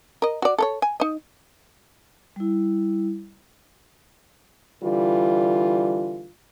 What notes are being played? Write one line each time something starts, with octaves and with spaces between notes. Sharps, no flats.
A#4 D#5
F#4 D5
A4 A#4 C#5
G#5
D#4 D#5
G3 E4
D3 E3 G3 F4